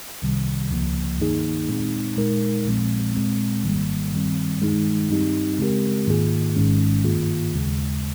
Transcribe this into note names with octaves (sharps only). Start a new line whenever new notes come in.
C2 C3 D#3 G3
C#2 C#3 F3 A#3
G2 D#3 A#3 D#4 G#4
A#2 G#3 C4 D#4
A#2 G#3 D#4 A#4
A#1 A#2 F3 G#3 C4
A#2 G#3 C4
G#1 G#2 D#3 G3 A#3
G2 D#3 G3 C4
G2 D#3 G#3 D#4 G#4
G2 G3 C4 D#4 G4
C#3 G#3 C4 G4 A#4
G#2 D#3 A#3 F4 G#4
G#1 G#2 D#3 G#3 C#4
G2 D#3 A#3 F4 G#4
D#2 C#3 G#3